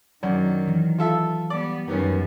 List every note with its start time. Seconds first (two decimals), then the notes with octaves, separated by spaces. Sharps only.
0.23 F#2 D#3 F#3 D5
0.68 E3
0.98 F4 A4 E5
1.50 G3 B3 D5
1.88 F#2 D#3 G3 B3 C#4